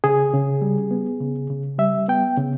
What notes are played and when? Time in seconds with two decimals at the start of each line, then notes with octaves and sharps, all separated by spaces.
0.04 C#3 G#4
0.33 C#3
0.61 G3
0.91 B3
1.21 C#3
1.50 C#3
1.79 G3 E5
2.08 B3 G5
2.38 C#3